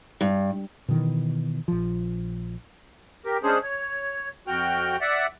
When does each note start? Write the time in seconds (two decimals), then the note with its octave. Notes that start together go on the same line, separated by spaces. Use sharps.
0.21 G2
0.88 B2 D#3 E3
1.68 A#1 F3
3.25 G4 A#4
3.43 G#3 C#4 D4 G#4 C5
3.63 C#5
4.47 F2 F#4 G5 F6
5.01 D5 E5 F#5